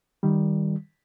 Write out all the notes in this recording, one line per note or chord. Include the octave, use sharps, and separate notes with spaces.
D#3 G3